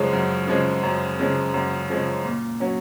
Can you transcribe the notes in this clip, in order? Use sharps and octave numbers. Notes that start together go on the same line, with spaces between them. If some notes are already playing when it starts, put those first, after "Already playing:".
Already playing: F#2 C#3 F3 G#3 C#4
F#2
C#3 F3 G#3 C#4
F#2
C#3 F3 G#3 C#4
F#2
C#3 F3 G#3 C#4
A#2
F#3 C#4